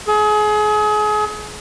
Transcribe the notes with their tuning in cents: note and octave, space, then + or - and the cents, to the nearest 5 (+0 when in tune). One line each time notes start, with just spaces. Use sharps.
G#4 +30